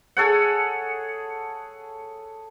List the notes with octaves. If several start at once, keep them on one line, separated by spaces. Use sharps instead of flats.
G#4 A4 C#5 F#5